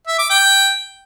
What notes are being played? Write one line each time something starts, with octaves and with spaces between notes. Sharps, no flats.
E5
D6
G5